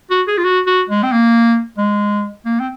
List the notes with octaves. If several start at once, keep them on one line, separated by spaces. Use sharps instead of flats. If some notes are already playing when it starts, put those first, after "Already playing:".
F#4
G#4
F4
F#4
F#4
G#3
C4
A#3
G#3
A#3
C4